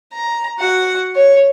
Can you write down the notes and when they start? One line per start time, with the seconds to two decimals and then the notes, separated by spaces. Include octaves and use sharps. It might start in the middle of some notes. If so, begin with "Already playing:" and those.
0.13 A#5
0.58 F#4 F#5
1.15 C#5